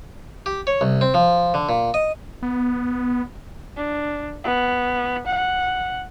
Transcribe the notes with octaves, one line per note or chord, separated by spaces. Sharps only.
G4
C#5
C2
C4
F3
D3
A#2
D#5
B3
D4
B3
F#5